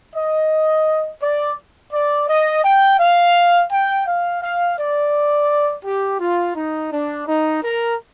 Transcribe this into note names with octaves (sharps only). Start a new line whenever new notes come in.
D#5
D5
D5
D#5
G5
F5
G5
F5
F5
D5
G4
F4
D#4
D4
D#4
A#4